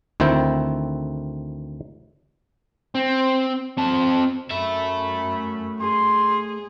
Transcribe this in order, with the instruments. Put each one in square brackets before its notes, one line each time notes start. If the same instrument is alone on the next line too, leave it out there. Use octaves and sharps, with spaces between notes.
[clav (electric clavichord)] D2 D#3 C4 E4 G5
[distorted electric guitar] C4
C4 A5
[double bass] F#2 [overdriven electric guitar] A3 E5 [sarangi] B5
[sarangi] G#4 [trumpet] C6